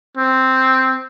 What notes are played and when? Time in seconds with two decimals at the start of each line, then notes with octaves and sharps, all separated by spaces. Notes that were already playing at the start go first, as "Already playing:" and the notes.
0.18 C4